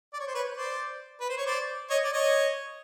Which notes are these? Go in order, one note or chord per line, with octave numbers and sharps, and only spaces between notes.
D5
C#5
C5
B4 C#5
C5 D5
B4
C5
C#5
C5 D5
C#5 D#5
D5
C#5 D#5